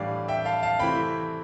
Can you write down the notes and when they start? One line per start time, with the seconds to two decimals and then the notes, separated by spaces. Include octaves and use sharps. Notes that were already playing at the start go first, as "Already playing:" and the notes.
Already playing: A2 E3 G3 D4 D5 F5
0.28 E5 G5
0.45 F5 A5
0.63 F5 A5
0.79 C3 E3 A3 C4 E4 G5 B5